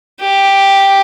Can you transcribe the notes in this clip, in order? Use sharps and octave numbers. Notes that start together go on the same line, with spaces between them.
G4